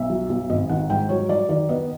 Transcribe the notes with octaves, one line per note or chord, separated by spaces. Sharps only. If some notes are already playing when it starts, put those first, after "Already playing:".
Already playing: B1 E5
F#3
B1
G#1 D#5
D#3 F#5
G#2 G5
F#3 C#5
F#3 D5
D#3 D5
B3 D#5